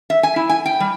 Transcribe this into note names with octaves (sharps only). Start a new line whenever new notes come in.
E5
G#5
E4
G#5
G5
G3